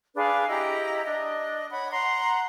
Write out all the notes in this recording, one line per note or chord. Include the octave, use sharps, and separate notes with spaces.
D4 G#4 B4 F5
E4 G4 D#5 A#5
D4 D#5
C#5 F#5 B5
F#5 A#5 C6